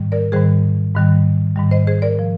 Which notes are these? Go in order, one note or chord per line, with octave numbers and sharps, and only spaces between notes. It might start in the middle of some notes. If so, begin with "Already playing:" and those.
Already playing: G#2 D#3 G3
A#4 D5
G#2 D#3 G3 G#4 C5
G#2 D#3 G3
G#2 D#3 G3
C5 D#5
G#4 C5
A#4 D5
F3